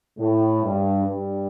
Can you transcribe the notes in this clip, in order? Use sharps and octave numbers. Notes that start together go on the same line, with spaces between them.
A2
G2
G2